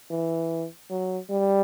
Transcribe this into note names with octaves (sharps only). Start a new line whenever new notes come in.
E3
F#3
G3